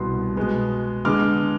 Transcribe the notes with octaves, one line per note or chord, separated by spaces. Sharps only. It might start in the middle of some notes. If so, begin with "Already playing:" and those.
Already playing: C2 B2 B3 C6
B2 G#3 B3
D3 G#3 B3 D6 F6